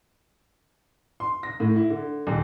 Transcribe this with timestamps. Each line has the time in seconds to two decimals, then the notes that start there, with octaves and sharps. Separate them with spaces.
1.20 C6
1.43 A#6
1.60 A2
1.76 E4
1.90 D3
2.27 D#1